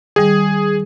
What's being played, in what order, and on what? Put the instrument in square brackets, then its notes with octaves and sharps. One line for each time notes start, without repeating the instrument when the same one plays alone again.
[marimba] D#3 G3 [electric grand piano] G#4